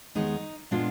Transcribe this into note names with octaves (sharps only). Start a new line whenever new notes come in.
D#2 D#3 G#3 B3 D#4
A#2 G#3 B3 D4 F4